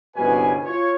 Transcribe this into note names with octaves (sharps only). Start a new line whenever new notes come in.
G1 C2 B2 C#4 B4 G#5
F4 C#5